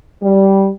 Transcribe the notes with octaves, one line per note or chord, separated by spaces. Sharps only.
G3